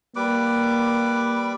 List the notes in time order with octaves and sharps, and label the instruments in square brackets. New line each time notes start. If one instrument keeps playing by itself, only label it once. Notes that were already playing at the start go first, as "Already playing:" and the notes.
[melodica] G3 B4 D6 [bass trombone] A#3